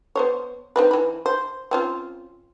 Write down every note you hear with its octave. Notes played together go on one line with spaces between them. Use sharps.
B3 C5 C#5
D#3 C4 B4
E3 B5
C5
C4 C#4 F4